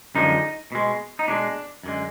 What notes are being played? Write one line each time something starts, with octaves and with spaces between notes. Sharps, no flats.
F#2 D3 F3 G#3 D#4
B2 G#3
D#4
B2 G#3 D4
F#2 D3 G#3